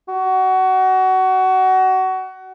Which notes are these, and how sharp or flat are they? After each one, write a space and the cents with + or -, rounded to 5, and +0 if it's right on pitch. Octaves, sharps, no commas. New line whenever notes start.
F#4 +25